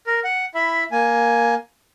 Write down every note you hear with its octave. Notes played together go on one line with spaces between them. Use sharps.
A#4
F#5
E4 E5 B5
A#3 G#5